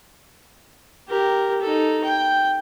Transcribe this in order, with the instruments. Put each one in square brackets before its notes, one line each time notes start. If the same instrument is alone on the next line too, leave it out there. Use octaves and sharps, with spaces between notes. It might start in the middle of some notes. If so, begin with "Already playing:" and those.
[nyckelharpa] G4 A#4
D#4 A4
G5